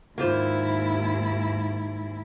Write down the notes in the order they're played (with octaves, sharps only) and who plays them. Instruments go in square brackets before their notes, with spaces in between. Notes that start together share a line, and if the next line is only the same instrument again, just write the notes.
[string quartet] D#2 G#2 E4 [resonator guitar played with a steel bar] A#3 F4 C5